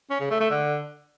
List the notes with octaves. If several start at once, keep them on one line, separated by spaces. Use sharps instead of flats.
C#4
C#3
A3
A3
D3